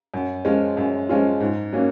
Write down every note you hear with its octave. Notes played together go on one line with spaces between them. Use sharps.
F#2
F3 G#3 C#4 F4
F#2
F3 G#3 C#4 F4
G#2
F#3 A#3 C#4